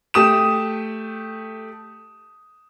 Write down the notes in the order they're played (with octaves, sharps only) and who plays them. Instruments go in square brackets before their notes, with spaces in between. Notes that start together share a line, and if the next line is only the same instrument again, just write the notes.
[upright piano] A3 G4 D#6 E7